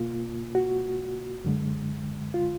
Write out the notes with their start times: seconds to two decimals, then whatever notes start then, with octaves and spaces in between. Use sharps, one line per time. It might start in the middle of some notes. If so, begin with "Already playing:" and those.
Already playing: B2 A#3 F4
0.55 F#4
1.44 F#2 D3 G#3
2.34 F4